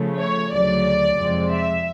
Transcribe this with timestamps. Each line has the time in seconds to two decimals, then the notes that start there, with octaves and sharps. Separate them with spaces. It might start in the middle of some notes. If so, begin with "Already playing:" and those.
Already playing: C#3 F3 A3
0.18 C#5
0.51 D2 C#3 F#3 D5
1.17 F2 C3 F3 G#3 C4
1.51 E5